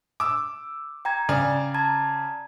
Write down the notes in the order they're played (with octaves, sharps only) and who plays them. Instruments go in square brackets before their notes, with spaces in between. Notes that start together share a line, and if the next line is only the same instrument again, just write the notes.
[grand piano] D6 E6
[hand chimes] G5 A#5 G#6
[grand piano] C#3 D5 G#5
[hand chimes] A5 A#5 G#6